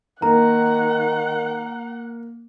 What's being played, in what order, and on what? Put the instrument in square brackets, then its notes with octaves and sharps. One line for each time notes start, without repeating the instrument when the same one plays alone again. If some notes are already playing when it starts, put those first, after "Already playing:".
[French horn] D#3 [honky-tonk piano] A#3 [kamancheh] F#5 [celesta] A#5